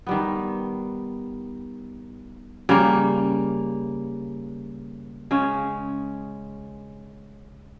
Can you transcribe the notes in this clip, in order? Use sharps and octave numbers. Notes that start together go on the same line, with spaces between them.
D#3 G3 B3
C#3 G3 A#3
C#3 G#3 C#4